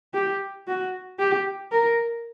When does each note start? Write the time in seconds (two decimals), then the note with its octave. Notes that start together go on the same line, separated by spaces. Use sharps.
0.14 G4
0.68 F#4
1.19 G4
1.72 A#4